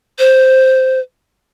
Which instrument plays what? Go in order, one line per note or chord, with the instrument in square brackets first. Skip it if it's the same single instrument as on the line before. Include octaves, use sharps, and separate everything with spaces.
[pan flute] C5